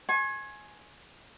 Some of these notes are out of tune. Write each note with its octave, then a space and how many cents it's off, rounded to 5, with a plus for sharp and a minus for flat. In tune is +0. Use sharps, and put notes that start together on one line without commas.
G#5 +10 C#6 -45